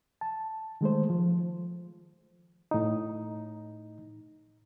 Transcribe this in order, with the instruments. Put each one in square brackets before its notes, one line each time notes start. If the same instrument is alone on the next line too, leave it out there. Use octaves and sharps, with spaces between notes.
[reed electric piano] A5
D#3 G#3 A3 C5
F3
A2 D#4